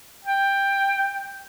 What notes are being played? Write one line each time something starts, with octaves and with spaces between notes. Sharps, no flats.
G5